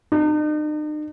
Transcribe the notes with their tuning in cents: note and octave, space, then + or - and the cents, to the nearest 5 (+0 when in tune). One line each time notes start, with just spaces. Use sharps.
D#4 -45